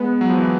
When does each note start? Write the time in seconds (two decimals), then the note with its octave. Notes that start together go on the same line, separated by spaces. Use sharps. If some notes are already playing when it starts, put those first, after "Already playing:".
Already playing: G#3 B3
0.21 F#3
0.30 F3
0.38 E3